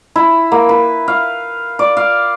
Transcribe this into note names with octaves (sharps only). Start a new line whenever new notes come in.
E4
A#3
B4
F5
D5
F5